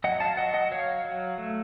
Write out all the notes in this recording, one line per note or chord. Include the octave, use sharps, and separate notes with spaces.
F#3 D#5 F#5
F5 A5
F#3 D#5 F#5
D#5 F#5
F#3 C#5 F5
F#3
A3